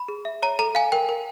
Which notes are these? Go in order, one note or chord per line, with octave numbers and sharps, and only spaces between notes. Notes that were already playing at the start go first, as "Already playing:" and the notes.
Already playing: B5
G#4
E5
C#5 A#5
A4 A#5
F5 G#5
A#4 G5
A#4